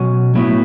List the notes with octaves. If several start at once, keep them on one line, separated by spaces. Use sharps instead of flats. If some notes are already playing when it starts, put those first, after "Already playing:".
Already playing: B2 F#3 C#4
A2 F#3 B3 E4